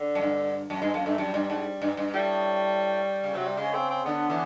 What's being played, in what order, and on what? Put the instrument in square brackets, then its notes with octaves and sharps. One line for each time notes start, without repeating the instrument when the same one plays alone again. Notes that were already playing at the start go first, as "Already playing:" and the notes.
Already playing: [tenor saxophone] D3
[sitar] F#2
G2
F#2
[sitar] G2 [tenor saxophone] G#3
[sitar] F#2 [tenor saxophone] A#3
[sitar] G2 [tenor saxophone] A3
[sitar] F#2 [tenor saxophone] G3
[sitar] G2
G#2
G2
G2
[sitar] A2 [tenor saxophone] G3
[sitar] C#3
[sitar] C3 [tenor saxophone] F#3
[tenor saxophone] G3
[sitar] C#3 [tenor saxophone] G#3
[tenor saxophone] C4
C4
[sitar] D3 [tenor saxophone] B3
[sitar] D3 E3